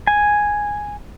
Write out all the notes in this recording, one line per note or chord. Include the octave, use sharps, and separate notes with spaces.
G#5